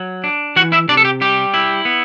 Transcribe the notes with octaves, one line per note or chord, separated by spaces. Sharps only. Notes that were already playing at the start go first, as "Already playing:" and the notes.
Already playing: F#3
D4
E3 F#4 F#5
E4 E5
C3 D4 D5
A4
G4
G3 G4
E4
B3